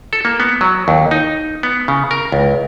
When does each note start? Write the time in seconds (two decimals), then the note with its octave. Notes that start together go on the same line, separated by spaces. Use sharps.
0.13 A4
0.25 A#3
0.40 B3
0.61 F#3
0.88 D#2
1.11 D#4
1.63 B3
1.88 C#3
2.11 A#4
2.32 C#2